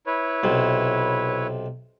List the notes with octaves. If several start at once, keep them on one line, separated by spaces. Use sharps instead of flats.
E4 B4 C#5
B1 C3